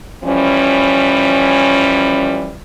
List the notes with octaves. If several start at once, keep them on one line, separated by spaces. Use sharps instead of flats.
E3 F3 G3 C#4